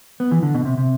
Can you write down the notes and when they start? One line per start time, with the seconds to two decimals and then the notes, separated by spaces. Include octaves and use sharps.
0.20 B3
0.32 E3
0.43 D3
0.54 B2
0.65 C3
0.78 C3